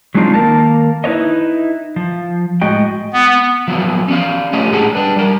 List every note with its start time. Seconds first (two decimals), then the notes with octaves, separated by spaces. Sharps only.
0.15 F#3 G#3 C4 D4 D#4 F4
0.34 D#3 A#3 A#4 A5
1.04 D#4 E4 B4 C#5 D#5
1.96 F3
2.62 A2 G#3 F#4 D#5 G5
3.13 B3
3.68 F3 F#3 B3
4.08 C#4 D5 F5
4.53 A3 F4 G4 C#5 D#5
4.72 A2 G#3 D4 G#4 F#5
4.95 D4 B4
5.16 G3 A#4